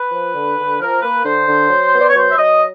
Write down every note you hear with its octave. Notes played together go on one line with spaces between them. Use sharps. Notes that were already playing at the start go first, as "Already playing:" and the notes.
Already playing: B4
F3
D3
D3
F3 A#4
A#3 B4
D3 C5
D3
F#3
B3
D5
C#5
F#3 C5
E5
F#3 D#5